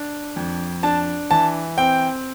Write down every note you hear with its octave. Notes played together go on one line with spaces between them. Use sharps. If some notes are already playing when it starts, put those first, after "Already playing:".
Already playing: D4
F2
D4 A5
E3 A5
C4 G5